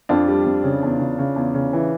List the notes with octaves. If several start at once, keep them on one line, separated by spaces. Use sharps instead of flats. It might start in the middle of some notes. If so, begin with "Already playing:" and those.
F2 D4 F4
G3
F2
C#3
E2
C#3
C#3
E2
C#3
E3